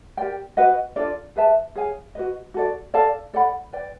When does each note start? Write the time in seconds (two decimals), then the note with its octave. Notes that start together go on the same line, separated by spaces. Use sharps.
0.17 G4 A#4 D5 G5
0.57 F#4 B4 D#5 F#5
0.96 D4 F4 A4 D5
1.36 G#4 B4 E5 A5
1.76 G#4 C#5 F5 G#5
2.15 F#4 B4 D#5
2.54 F#4 A4 D5
2.94 A4 D5 F5 A5
3.33 A4 D5 F#5 B5
3.73 B4 D5 G5